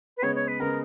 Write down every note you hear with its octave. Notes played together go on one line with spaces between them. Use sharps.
B4
C#3 G#3 B3 C#5
C#5
B4
C#3 G#3 B3 A#4